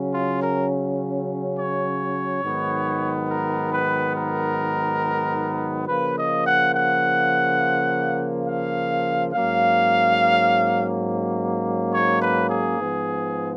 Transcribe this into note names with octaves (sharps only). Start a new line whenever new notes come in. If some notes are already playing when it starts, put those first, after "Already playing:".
Already playing: C#3 F#3 C#4
F4
A#4
C#5
G#2 D#3 F#3 B3
A#4
B4
A#4
C#3 F3 A#3 B4
D#5
F#5
F#5
F5
G#2 F#3 A#3 C#4 F5
C#5
B4
G#4
G#2 F3 B3